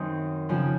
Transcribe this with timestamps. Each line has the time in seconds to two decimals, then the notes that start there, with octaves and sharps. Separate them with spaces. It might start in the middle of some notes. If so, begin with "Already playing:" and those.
Already playing: F#2 D#3 F#3 C4 D#4
0.49 F2 C#3 F3